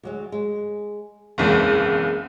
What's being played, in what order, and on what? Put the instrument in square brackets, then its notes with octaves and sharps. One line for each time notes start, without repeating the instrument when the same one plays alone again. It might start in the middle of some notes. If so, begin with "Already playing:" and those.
[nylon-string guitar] D2 F#3 G#3
G#3
[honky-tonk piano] F#1 B1 E2 [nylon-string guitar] G#3 A#3 C4